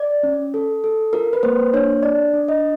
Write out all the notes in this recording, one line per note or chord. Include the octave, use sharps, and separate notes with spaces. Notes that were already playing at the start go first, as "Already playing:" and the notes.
Already playing: D5
C#4
A4
A4
F4 A#4
B4
A#3 C5
D4 C#5
F4 D5
D4
D#5